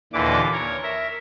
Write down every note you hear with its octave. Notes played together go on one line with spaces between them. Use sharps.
D#2 A#2 D3 E3 D6
A#4 C#5
A#4 E5